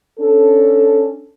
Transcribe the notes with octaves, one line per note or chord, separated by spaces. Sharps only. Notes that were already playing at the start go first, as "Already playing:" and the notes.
C#4 D4 A4